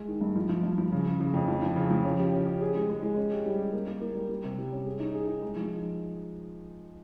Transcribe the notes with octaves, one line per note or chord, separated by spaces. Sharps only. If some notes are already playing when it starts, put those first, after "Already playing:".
Already playing: G#3
D#3
G2
F3
F3
G2
F3
C#3
C#3
C#3
F2
F3
F3
C#3
F3
C#4
G4
C#4
G4
G#4
G#3
G#3
G#3
C#4
G4
G3
G4
A#3
A#3
A#3
G3
G3
C3
G3
C#4
G#4
D#4
G#4
D#4
G#3
F3